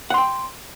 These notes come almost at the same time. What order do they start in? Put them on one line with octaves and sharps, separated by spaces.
F#5 C6 G5